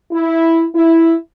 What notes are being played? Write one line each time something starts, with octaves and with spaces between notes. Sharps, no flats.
E4
E4